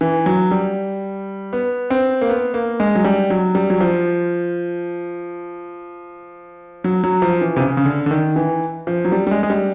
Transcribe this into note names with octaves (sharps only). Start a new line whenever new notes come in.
E3
F#3
G3
B3
C4
A#3
B3
A#3
G#3
F#3
G3
F#3
G3
F#3
F3
F#3
F#3
F3
E3
C3
C#3
C#3
D3
D3
D#3
E3
F3
F#3
G3
G3
G#3
G#3
G3